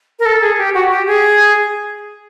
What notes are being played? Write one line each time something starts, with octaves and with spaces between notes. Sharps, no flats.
A#4
A4
G#4
G4
F#4
G4
G#4